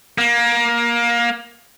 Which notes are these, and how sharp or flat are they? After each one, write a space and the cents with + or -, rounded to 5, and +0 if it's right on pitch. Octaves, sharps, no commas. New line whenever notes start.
A#3 +20